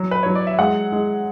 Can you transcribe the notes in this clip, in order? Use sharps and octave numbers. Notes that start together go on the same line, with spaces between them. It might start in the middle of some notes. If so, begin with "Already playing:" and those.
Already playing: F#3
B4
F#3 C#5
D5
E5
G#3 F#5
G#3